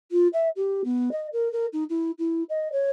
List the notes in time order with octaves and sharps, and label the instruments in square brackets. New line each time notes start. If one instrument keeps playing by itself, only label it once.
[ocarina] F4
E5
G4
B3
D#5
A#4
A#4
D#4
E4
E4
D#5
C#5